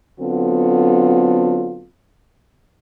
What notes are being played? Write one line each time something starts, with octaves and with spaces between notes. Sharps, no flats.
D3 F#3 B3 C4 F4 A4